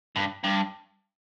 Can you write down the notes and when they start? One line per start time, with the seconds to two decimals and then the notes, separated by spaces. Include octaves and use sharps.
0.16 G2
0.44 G2